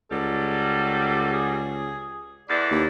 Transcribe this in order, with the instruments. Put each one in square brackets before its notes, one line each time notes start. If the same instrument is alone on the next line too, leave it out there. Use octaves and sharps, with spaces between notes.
[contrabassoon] C#2 [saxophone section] F#3 G3 [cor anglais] A4
[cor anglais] G#4
[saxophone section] E2 E3 A4 [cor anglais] D5
[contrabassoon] D#2